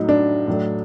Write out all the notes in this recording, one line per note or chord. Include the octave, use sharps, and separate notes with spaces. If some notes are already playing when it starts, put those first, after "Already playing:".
Already playing: A2 F#3 A3 D#4
D4
A2 F#3 A3